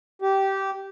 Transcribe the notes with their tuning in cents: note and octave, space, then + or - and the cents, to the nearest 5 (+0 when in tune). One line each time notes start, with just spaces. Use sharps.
G4 -15